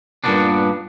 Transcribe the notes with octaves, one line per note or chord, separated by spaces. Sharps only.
G2 A#2 G#3 A#3 B3 D4